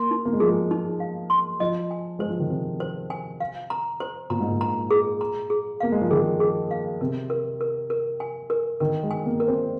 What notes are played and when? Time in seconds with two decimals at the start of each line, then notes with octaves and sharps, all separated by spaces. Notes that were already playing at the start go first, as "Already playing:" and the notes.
Already playing: A#3 C6
0.11 D#4
0.25 A#3
0.33 G#3
0.40 F3 G#4
0.48 G#3
0.71 D#4
1.00 F5
1.30 C6
1.60 F3 D#5
1.91 G#5
2.19 G#3 C5
2.30 F3
2.40 D#3
2.50 C3 C5
2.80 C5
3.10 G#5
3.40 F5
3.70 A#5
4.00 C5
4.30 A#2 A#5
4.40 G#2
4.50 A#2
4.61 A#5
4.91 G#4
5.21 A#5
5.50 G#4
5.80 A#3 F5
5.92 G#3
6.01 F3
6.10 D#3 G#4
6.40 G#4
6.71 F5
7.01 C3 A#4
7.30 A#4
7.61 A#4
7.90 A#4
8.20 G#5
8.50 A#4
8.80 D#3 A#4
9.03 G#3
9.11 G#5
9.26 A#3
9.40 A#4
9.48 C4